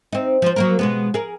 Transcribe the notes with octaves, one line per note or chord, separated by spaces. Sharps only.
C4 D#4
F3 C5
F#3 A#3 A#4
B2 G#3 B3
G#4 A#4